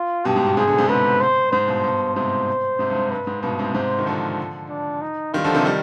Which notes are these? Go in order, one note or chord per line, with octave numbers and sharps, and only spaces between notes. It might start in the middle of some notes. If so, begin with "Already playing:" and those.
Already playing: F4
G2 B2 G4
G#2
G2 B2
G#2 C3 G#4
B2 D3
G#2 C3
G#2 B4
C5
G#2 C5
G2 B2
G2 B2
G#2 C3 C5
G#2 C3
G2
G#2
G2 B4
G#2
G2 B2 B4
G#2 C3
G#2 C3 C5
D#3
D3 F3
D4
D#4
D#3 G3 F4
D3 F3
C3 D#3
D#3 G3